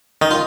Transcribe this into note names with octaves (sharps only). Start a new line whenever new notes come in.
D#3 D#4
F4